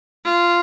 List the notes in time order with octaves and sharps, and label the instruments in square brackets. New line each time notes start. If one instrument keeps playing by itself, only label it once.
[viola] F4